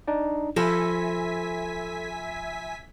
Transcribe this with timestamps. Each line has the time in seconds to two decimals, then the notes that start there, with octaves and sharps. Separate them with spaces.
0.08 D4 D#4 D5
0.56 F3 A4 E5 G#5 B5 C6 A#6 B6